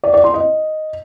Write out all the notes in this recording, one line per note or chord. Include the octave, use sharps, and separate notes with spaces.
D5
D5
C6
D#5